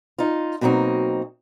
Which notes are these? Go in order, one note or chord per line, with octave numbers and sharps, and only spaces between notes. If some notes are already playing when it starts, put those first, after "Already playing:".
D#4 F4
B2 F#3 A#3 C4 D#4